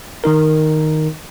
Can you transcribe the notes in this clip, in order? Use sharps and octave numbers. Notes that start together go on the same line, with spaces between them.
D#3 D#4 A#4